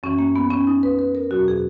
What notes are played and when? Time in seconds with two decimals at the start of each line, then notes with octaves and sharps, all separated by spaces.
0.03 F#2 E3 C#4
0.19 A#3
0.36 B3
0.51 C#4
0.67 D#4
0.83 B4
0.99 B4
1.15 A#4
1.31 E2 B2 F#3 F#4
1.48 G#4